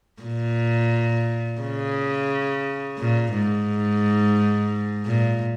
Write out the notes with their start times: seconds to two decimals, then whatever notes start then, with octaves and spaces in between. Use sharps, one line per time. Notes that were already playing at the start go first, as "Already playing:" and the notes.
0.23 A#2
1.61 C#3
2.99 A#2
3.33 G#2
5.06 A#2